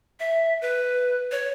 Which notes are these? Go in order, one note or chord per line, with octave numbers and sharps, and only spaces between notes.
E5
B4
C#5